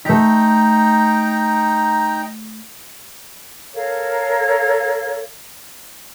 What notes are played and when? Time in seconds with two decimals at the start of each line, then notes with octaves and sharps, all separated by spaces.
0.05 A3 D#4 G5 A#5 B6
3.75 A4 A#4 C#5 F5